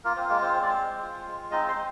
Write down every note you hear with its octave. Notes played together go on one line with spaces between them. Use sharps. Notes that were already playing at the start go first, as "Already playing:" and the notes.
A#3 F4 A#4
C4 C5
G#3 A#3 A#4
C4 C5
C4 C5
D5
C4 C5
G#3
F4
G#3
C4 D#4 D#5
C5 C6
G#3